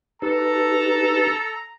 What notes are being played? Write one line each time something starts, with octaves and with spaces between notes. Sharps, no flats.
D#4 G4 A4 B4 A#5